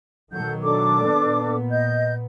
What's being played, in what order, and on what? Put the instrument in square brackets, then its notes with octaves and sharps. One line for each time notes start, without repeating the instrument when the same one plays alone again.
[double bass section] B2 D#3 F#3 [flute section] A4 F#5 G6
[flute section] D4 A4 D6
[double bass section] A#2 B3
[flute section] D#5 G6